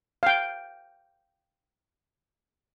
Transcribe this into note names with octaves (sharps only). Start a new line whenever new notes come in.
F5 G5